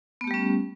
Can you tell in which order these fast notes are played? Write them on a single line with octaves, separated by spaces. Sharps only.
B3 A3 G4 G3 C#4